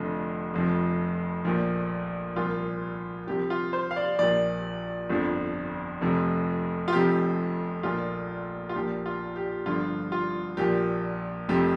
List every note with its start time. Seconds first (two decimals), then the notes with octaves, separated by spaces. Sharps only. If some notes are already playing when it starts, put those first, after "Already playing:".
Already playing: F1 F2 D3 F3
0.54 F1 F2 F3
1.45 A#1 A#2 F3
2.36 C2 A#2 F3 F4
3.27 C2 C3 F3 G4
3.50 F4
3.73 C5
3.91 F5
3.96 D5
4.19 A#1 A#2 F3 D5
5.09 G1 F2 D3 F3
6.01 F1 F2 C3 F3
6.88 F4
6.93 F1 F2 C3 F3 G4
7.83 A#1 A#2 F3 F4
8.69 F4
8.75 A#1 A#2 F3 G4
9.06 F4
9.36 G4
9.66 G1 G2 D3 F3 F4
10.12 F4
10.57 A#1 A#2 F3 G4
11.49 F1 F2 C3 F3 G4